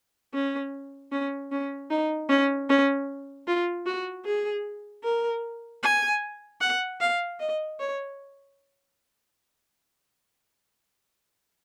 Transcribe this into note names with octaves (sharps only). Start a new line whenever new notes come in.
C#4
C#4
C#4
D#4
C#4
C#4
F4
F#4
G#4
A#4
G#5
F#5
F5
D#5
C#5